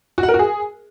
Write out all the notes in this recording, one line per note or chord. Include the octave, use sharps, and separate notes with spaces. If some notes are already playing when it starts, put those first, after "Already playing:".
F#4
F#5
A#4
F#4
G#4